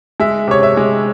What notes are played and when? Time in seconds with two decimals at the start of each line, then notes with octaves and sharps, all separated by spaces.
0.20 G#3 E5
0.48 C3 C#5
0.63 E5
0.77 G#3